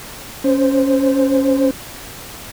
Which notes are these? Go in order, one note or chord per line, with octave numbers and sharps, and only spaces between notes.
C#4 C5